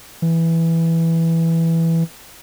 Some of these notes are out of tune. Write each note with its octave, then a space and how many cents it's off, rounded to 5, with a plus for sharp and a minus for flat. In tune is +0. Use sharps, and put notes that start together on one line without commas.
E3 +0